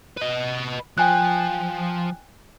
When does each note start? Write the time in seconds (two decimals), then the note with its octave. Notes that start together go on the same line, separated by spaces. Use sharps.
0.17 B4 D#5
0.98 F3 G5 G#5 F#6